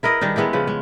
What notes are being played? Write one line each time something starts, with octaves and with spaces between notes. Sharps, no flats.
E4 A#4 B4 D#5
D#3 G3 D4 D#4
G#3 B3 E4 G4
C#3 F3 B4
G#3